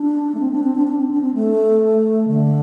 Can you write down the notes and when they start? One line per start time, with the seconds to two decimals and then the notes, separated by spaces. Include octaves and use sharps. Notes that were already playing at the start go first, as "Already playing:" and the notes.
Already playing: D4
0.35 A3
0.39 C4
0.51 D4
0.63 C4
0.75 D4
0.87 D4
0.98 C4
1.11 D4
1.21 C4
1.34 A3
2.28 D3